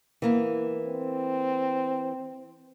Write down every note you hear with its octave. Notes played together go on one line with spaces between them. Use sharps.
E3 A#3 B3
C4